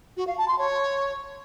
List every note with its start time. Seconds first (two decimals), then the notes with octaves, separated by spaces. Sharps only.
0.17 F#4
0.27 F5
0.37 A5
0.48 C6
0.58 C#5